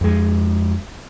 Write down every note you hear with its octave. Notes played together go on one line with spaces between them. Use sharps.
F2 G#3